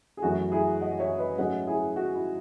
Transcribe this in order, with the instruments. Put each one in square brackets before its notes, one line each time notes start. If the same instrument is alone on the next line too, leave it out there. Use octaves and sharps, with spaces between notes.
[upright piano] G#4
F#2 E3 A3 F#4
E4 G#4
D#5 F#5
C#5 E5
B4 D#5
G#2 F#3 A3 C#4 D#5 F#5
E4 G#4
F#4
E4